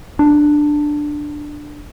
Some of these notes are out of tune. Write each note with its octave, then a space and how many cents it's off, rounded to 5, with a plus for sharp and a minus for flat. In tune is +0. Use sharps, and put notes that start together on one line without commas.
D4 +10